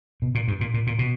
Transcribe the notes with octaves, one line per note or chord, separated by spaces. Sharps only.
B2
A#2
G2
A#2
A#2
A#2
B2